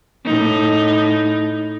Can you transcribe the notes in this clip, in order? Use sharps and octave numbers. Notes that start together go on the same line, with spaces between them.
A2 D#4